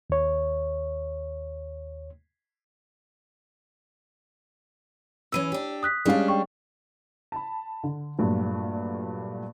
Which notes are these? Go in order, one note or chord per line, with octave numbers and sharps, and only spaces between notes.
D#2 C#5
E2 E3 C#4 E6 D#7
D4 G4
D#6 F#6 B6
G3 G#3 C#4 D4 F5
G5 C#6
A5 B5
D3
G2 A#2 F#3 A3